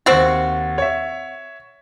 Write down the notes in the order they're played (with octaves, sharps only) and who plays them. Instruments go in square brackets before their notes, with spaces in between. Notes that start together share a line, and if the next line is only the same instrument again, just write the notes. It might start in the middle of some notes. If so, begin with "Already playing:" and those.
[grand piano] D#2 A6 [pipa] C4 F#4
[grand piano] C#5 E5